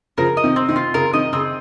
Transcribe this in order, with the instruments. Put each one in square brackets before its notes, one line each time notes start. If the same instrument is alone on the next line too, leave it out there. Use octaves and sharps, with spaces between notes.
[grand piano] C#3 F3 [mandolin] A#4
[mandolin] D#5
[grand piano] C3 D#3
[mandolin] C4
[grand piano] C3 D#3
[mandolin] F4
[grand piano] C#3 [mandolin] A#4
[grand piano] C3 D#3 [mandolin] D#5
[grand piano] C#3 [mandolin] C4